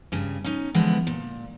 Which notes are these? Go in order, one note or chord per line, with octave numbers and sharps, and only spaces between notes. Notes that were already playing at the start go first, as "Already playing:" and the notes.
G2 C#3 G#5
C#4 D#4
D3 E3 F3 G#3 B3
A#2